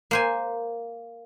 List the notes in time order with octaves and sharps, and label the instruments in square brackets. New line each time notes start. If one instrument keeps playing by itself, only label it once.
[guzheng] A#3 C5 G#5